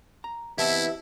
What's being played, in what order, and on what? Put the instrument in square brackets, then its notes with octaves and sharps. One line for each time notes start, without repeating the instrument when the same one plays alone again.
[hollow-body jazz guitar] A#5
[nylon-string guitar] E3 B3 C4 [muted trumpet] E4 [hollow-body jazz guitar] G4 D#5 A5 [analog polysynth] E5